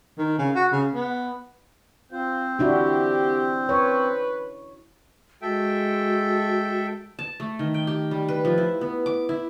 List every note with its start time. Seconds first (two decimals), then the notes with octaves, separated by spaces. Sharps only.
0.18 D#3
0.39 C#3
0.55 F#4
0.72 C#3
0.94 B3
2.12 C4 F4 C5
2.59 D4 E4 F#4 G4
3.69 B4 C#5
5.42 G#3 F#4 A4 E5 G5
7.19 A5
7.40 A3
7.59 D#3
7.74 G5
7.87 G4
8.11 G3
8.29 B4
8.45 F3
8.58 E4
8.81 B3
9.06 D6
9.29 E4